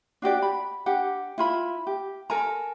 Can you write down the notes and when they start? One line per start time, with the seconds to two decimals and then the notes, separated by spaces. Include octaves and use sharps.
0.22 D4 F#4 G4 D5
0.42 B5
0.86 D4 G4 F#5
1.38 E4 F4 B5
1.87 G4
2.30 A4 A#4 G#5 A#5